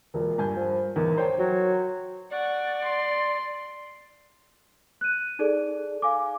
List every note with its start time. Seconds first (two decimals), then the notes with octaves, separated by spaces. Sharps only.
0.14 E1 A#2
0.38 G2 G#5 G6
0.56 F3
0.96 E2 A2 D#3
1.18 C5 C#5 G5
1.39 F#3
2.31 D5 F#5 C#6
2.84 C6
5.01 F#6 D#7
5.39 D#4 G#4 A4 D5
6.02 F5 G#5 D6